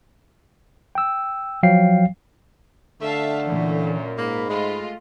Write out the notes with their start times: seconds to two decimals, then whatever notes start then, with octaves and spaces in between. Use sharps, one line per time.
0.95 G5 E6
1.63 F3 F#3 F5 G5 C7
3.01 D3 A3 E5 F5 A5
3.46 F#2 A#2 E3
4.18 G#2 A#3 B5
4.50 G#3 A3 F4 D#5